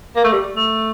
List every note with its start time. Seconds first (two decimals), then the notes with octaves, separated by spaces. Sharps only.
0.16 A#3
0.24 A3
0.32 G3
0.56 A3